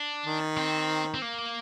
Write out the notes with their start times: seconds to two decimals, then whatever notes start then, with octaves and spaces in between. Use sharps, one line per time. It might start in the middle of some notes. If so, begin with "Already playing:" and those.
Already playing: D4
0.26 D#3
0.58 C4
1.14 C4
1.22 A#3